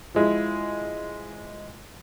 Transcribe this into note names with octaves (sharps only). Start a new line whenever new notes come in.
F3 G#3 E4